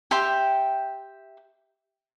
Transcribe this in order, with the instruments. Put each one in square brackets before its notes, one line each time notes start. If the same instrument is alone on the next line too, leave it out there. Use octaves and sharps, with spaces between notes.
[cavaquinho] G4 E5 G5 C6